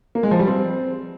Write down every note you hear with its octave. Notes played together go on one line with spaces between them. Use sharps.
A#3
G#3
F3
G3
C4